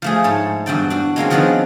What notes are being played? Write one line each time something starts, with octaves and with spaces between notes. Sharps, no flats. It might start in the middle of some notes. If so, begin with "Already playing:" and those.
F3 A3 G#4
G#2 C#5 A5
E2 G2 E3 F#4 G5 A5
D4 F#4
G#3 A#3 C4 C#4
D#3 F3 F#3 B3 C4 D4